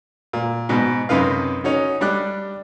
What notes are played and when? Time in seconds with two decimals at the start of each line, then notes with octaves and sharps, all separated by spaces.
0.33 A#2
0.69 G#2 B2
1.09 F#2 C3 D#4 B4 F5
1.64 C#4 D#4 F#4
2.01 G3 D4 G4 F#6